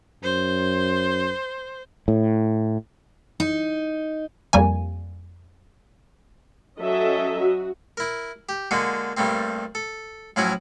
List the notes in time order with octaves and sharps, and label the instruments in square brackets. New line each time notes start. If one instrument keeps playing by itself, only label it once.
[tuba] F#2 [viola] C5
[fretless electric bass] A2
[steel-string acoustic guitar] D#4
[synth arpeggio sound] F2 G3 A#3 G#5
[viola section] F#3 C#4 A4 D#5 E5
F#4
[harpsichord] E4 A#4
G4
D3 G#3 A#3 F#4
G2 G3 A3 A#3 C4
A4
A2 F3 F#3 C#4 E4 F#4